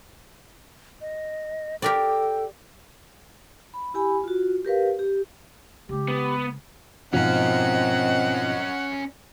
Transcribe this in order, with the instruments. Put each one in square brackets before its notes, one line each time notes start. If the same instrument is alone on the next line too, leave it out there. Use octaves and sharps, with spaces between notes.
[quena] D#5
[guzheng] G4 A#4 D5 [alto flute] A4 [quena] G5
[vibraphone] B5
E4 G4 G#5 B5
F4 F#4
G4 A#4 B4 F5
G4
[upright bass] C#3 G#3 [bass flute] G4
[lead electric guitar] B3
[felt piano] G#2 B2 F3 [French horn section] C4 D#5 [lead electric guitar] C#4 A#4 [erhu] F#5